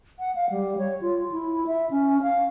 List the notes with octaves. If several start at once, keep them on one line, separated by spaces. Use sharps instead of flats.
F#5
F5
G3
C#5
F4
E4
E5
C#4
F5